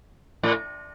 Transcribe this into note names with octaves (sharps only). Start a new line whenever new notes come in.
A2